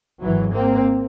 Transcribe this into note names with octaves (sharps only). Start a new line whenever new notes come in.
G#1 G#2 E3 F#3
A#3 C4